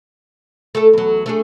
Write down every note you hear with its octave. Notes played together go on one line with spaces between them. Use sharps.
A3 A4
E2 F#3
A3 D4 G#4